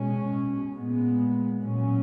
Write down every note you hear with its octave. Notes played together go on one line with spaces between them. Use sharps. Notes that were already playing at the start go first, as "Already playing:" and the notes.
Already playing: B2 G#3 C#4
A#2 G#3 B3
A#2 F#3 C#4